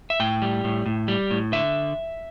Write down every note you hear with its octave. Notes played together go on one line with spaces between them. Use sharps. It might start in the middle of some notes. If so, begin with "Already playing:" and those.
E5
A2 G5
G3
A2
A2
G3
A2
D3 E5